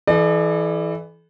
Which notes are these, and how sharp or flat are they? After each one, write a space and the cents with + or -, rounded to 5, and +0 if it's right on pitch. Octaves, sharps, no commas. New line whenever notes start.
E3 +0 A4 -40 D5 +40